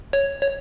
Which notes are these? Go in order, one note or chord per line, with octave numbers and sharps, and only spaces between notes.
C#5
C#5